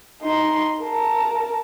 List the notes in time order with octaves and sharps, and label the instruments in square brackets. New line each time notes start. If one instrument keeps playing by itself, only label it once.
[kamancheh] D#4 C6
A#4 A5